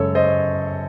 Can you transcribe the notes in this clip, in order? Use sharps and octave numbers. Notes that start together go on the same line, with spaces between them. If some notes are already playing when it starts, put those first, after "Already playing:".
Already playing: F#2 C#3 G#3 A4 C#5
C5 D#5